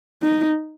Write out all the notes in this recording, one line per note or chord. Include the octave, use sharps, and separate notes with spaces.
D#4